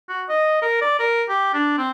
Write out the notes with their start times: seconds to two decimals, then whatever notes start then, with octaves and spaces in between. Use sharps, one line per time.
0.09 F#4
0.29 D#5
0.62 A#4
0.82 D5
0.99 A#4
1.29 G4
1.54 D4
1.78 C4